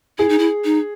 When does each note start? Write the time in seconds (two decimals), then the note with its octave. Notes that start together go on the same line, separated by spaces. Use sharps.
0.19 E4 G#4
0.29 D#4
0.39 E4
0.65 D#4